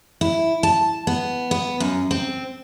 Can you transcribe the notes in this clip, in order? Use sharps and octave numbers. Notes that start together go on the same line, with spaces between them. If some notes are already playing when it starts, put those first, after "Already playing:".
E4
A5
B3
B3
F#2
C4